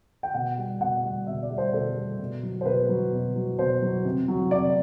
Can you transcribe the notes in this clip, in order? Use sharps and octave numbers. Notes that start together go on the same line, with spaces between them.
G5
B2 F#5
G3
B2 F#5
G3
B2 E5
D5
G3
C5
B2 A4
G3
B2
F#3
C5
B2 B4
F#3
B2
F#3
B2 C5
F#3
C3
F#3
C3 D5